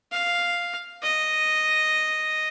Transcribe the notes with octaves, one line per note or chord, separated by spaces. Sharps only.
F5
D#5